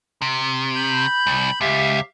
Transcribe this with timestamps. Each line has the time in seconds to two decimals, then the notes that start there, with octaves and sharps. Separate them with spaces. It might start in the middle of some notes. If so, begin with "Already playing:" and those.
0.22 C3
0.75 B5 G6
1.27 C2
1.61 C#2 G4 E5 F5